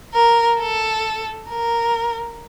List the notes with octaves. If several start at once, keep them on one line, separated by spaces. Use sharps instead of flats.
A#4
A4
A#4